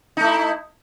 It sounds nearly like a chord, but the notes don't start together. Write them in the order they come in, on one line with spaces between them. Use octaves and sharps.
D#4 A3 E4